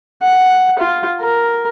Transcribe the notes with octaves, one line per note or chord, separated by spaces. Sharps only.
F#5
F4
A#4